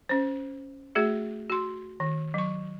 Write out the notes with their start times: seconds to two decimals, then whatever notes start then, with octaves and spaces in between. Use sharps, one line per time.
0.09 C#4 C5
0.95 A3 F#4 G#4 E5
1.50 F#4 C6
2.00 D#3
2.34 F#3 C#6